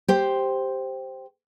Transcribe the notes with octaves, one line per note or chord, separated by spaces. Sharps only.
G4 C5